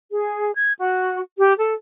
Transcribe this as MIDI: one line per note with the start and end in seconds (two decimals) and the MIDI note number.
0.10 0.54 68
0.54 0.72 92
0.79 1.20 66
1.38 1.53 67
1.58 1.73 69